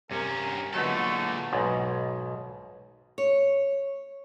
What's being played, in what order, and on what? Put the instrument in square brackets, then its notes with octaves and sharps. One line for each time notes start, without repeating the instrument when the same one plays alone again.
[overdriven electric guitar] G2 C#4 [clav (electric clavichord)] C3 [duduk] A#4
[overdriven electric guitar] A#2 A4 [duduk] D3 [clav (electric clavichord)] F#3 G#3 B3 [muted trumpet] A3
[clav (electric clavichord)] B1 G#2 B2
[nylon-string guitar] C#5